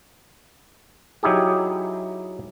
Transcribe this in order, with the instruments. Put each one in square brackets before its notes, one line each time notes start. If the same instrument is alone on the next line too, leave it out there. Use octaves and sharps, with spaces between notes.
[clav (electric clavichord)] F#3 D#4 E4 G4 G#4